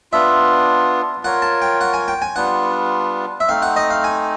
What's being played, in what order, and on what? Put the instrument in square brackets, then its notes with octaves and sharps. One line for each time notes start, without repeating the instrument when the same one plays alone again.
[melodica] B3 D4 F4 [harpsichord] E5
[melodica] F4 A#4 C#5 [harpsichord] F#5
[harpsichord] A5
G5
F#5
G#5
G5
G#5
[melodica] G3 B3 D4 F4 [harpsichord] F#5
[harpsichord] E5
[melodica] A3 C4 D#4 [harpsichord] F5
[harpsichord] F#5
D#5
F5
G#5